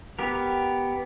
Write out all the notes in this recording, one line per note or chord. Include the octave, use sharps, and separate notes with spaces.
B3 G4 A#4